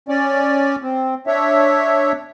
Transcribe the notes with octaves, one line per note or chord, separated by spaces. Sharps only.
C#4 D5
C4
D4 C#5 E5